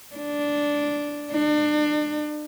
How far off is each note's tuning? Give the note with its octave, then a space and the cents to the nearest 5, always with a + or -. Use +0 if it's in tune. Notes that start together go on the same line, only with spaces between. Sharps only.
D4 -5
D4 +35